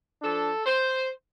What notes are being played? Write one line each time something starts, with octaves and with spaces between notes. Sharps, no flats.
F3 D4 A4
C5